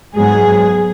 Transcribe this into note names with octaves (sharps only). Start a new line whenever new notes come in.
G#2 F#3 B3 G#4